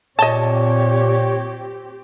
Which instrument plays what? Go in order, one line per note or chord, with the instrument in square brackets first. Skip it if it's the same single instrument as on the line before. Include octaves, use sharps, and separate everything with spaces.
[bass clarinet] A#2 [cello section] C4 G4 [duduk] C#5 [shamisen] D#5 A5